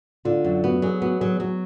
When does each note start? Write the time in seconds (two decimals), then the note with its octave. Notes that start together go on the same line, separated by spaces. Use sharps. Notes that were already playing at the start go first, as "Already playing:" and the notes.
0.25 D3 F4
0.44 F#2
0.64 B3 F#4
0.76 F#4
0.82 F#3 G#4
1.02 B3 F#4
1.20 F#3 G#4
1.40 F#3 F#4